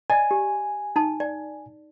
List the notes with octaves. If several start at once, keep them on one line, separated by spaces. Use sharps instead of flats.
D5 D#5 G#5
G4
D#4 A5
D5